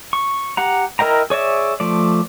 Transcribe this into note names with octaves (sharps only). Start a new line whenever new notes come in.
C#6
G4 F#5 A#5
E4 A#4 D#5 G5 A#5
G#4 C#5 D5 E5
F3 A3 D5